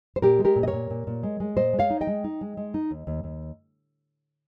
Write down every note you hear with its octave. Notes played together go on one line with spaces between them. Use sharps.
C5
A#2 G4 A#4
G#3
G4 A#4
A#2
D#5
A#4 C#5
A#2
A#2
A#2
G#3
G#3
A#2 C5 D#5
G#3
C#5 F5
D#4
D#5 G5
G#3
D#4
G#3
G#3
D#4
D#2
D#2
D#2